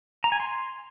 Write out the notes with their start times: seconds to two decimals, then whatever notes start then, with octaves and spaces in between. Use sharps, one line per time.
0.24 A#5
0.32 G#5
0.40 C6